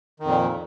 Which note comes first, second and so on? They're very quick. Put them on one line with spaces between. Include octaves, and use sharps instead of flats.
D#3 F2 A#2